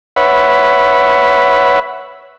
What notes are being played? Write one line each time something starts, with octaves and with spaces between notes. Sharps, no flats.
B4 C#5 E5 F#5 B5